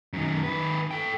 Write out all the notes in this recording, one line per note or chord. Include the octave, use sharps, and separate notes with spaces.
F#2 D#3
D#3 B4
A4 G5